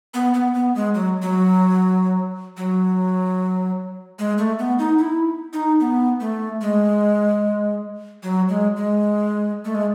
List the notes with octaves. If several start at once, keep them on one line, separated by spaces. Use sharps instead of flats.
B3
B3
B3
G#3
F#3
F#3
F#3
G#3
A3
B3
D#4
E4
D#4
B3
A3
G#3
F#3
G#3
G#3
A3
G#3